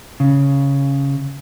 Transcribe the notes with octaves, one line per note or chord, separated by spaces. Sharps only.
C#3